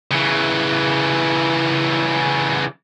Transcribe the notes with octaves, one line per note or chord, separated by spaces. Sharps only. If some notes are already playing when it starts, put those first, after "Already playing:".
C#3 E3